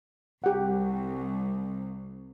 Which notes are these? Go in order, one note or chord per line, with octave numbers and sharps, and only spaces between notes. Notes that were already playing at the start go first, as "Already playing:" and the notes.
C2 G4 F#5